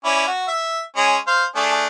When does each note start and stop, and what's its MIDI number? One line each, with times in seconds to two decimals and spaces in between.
0.05 0.27 61
0.05 0.27 64
0.05 0.27 74
0.27 0.47 66
0.48 0.82 76
0.96 1.17 56
0.96 1.17 61
1.27 1.45 72
1.27 1.45 77
1.56 1.87 57
1.56 1.87 62
1.56 1.87 68